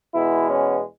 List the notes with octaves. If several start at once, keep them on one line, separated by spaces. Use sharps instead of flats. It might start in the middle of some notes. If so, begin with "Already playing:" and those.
E2 B2 G#3 B3 E4
C#4